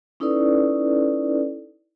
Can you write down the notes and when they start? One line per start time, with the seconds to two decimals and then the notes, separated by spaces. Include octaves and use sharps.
0.20 C#4 D#4 E4 A4 B4 D5